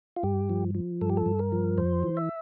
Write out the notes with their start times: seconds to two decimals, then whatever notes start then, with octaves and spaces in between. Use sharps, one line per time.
0.16 F4
0.23 G2 G4
0.50 F3
0.75 F3
1.01 G2 A4
1.10 G4
1.17 A4
1.26 G2
1.39 A#4
1.52 F3
1.78 F2 C5
2.03 E3
2.17 E5